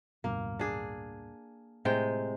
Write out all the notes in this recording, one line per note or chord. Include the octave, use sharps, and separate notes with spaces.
D1 G2 B2 A#3
D4 G#4
A2 C3 G#3 G5